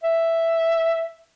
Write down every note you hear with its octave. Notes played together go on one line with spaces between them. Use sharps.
E5